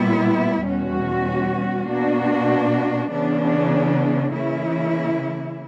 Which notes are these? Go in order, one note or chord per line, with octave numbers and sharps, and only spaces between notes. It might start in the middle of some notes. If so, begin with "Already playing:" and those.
Already playing: A#2 G3 B3 E4
E2 B2 G3 C#4 F#4
B2 A#3 D4 F#4
C#3 E3 B3 D4
C#3 E3 A#3 E4